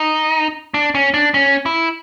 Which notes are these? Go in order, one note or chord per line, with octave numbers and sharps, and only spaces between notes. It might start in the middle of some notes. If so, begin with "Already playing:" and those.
Already playing: D#4
D4
C#4
D4
C#4
E4